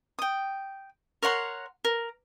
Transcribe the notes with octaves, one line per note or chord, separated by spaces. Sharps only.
G5 D#6
A#4 C#5 F#5 C6
A#4